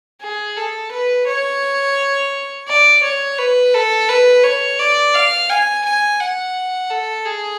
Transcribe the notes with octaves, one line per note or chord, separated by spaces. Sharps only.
G#4
A4
B4
C#5
D5
C#5
B4
A4
B4
C#5
D5
F5
G#5
G#5
F#5
A4
G#4